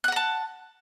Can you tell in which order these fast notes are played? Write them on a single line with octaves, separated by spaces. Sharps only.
F#6 F#5 A#5 A5